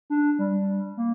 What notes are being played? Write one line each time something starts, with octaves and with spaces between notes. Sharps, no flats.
D4
G3
A#3